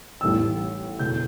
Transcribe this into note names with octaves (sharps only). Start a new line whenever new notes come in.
A1 A2 E3 G3 B3 E6
E1 E2 B2 G6